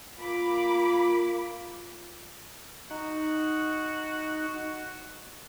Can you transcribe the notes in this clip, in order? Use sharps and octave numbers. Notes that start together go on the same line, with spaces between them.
A#3 F4 B5 D6
D#4 F#4